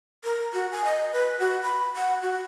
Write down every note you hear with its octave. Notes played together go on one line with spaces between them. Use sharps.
A#4
F#4
G#5
D#5
B4
F#4
B5
F#5
F#4